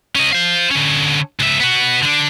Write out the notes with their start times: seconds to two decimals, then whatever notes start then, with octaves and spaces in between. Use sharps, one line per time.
0.16 C#4 D#5
0.32 C5 F5
0.71 D3 C#4
1.40 C#2 E5
1.60 B3 F#4
2.02 D3 D4